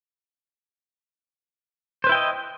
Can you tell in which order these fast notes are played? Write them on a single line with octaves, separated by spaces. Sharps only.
C5 B4 E4 G5 D#5